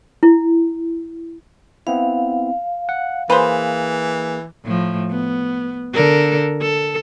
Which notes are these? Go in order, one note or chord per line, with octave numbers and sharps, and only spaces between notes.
E4
B3 C4 E4 F5
F#5
E3 A#3 G#4 B4 C5
A2 F3
B3
D3 A4 A#4
A4